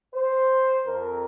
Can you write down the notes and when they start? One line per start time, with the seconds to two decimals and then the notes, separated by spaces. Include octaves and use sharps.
0.15 C5
0.86 F2 A#4